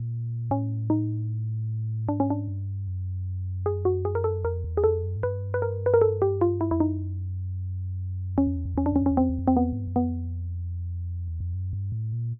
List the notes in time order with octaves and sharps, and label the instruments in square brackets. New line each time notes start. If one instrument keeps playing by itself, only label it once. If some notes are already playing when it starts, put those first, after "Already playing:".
Already playing: [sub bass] A#2
[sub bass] A2 [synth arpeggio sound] C#4
[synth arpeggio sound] D#4
[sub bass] G#2 [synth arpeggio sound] D4
[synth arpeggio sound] C#4
D4
[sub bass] G2
F#2
[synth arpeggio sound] G#4
F#4
G#4
A#4
A4
[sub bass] F2 [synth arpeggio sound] A#4
[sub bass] E2
[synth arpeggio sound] G#4
[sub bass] F2 [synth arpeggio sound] A4
[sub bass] F#2
G#2
[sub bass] G2 [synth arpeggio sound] B4
[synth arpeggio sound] B4
A#4
B4
A#4
A4
G4
F4
E4
[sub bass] F2 [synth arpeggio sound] E4
[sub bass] F#2 [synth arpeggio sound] D#4
[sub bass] E2 [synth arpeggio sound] C#4
[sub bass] F2
E2
F2
[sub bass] E2 [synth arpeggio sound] C#4
[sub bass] F2 [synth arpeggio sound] D4
[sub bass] E2 [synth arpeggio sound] C#4
[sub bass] F2
[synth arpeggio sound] C#4
[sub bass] E2
[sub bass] F2 [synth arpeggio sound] C4
[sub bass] E2
F2
[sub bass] E2 [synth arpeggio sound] C4
[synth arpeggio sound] B3
[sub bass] G#2
G2
F#2
[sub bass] F2 [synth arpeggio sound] B3
[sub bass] E2
F2
F#2
G2
A2
A#2